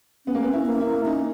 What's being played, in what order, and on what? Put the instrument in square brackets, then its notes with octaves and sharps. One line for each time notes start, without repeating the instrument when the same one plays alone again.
[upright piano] B3 [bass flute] C#4
[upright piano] A#3
B3
E4
[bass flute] A#3
[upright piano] E4
[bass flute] C#4 [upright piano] D#4